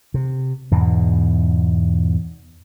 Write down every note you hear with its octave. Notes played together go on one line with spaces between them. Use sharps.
C3
E2 G#2 B2